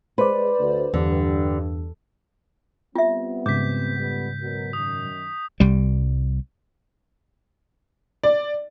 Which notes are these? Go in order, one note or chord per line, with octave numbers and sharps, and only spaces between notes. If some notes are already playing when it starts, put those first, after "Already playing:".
G#3 B4 C5 D5
D2
E2 G2 D3
G3 B3 C4 F4 E5
G#2 C#3 D6 G6 B6
F2 G3 B3
B2 F#3 A#4
F#2 D#3 D#6
C2 G3
D5